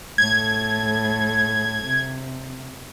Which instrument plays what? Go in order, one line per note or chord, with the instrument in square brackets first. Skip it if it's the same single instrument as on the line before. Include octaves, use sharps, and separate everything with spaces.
[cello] A2 A4 [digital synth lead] G#6
[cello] C3